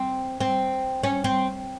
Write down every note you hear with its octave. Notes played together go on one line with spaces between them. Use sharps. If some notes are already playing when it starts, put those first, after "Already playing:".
Already playing: C4
C4
C#4
C4